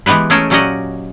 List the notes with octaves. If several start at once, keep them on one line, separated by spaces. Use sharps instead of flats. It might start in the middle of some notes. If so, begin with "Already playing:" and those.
E3 G#3 B3 G4 B4
A3 C#4 G#4 A#4 G5 A5
A#2 F#3 C#4 G4 D#5 F#5